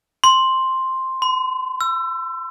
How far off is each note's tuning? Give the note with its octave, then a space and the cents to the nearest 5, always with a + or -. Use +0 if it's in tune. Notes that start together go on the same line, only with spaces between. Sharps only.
C6 +5
C6 -40
E6 +30